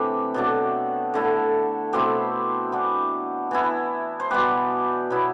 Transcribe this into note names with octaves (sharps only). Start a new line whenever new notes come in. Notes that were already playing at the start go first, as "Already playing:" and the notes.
Already playing: C3 E3 A3 D4 G4
B2 F#3 A3 D4
D3 A3 E4
B2 A3 C4 E4 G4
E3 B3 D4
E3 B3 E4
C5
B2 G3 B3 G4 B4
B2 F#3 B3 E4